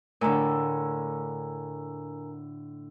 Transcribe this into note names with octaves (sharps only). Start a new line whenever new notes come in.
A2 D3 A#4 G#5 A#5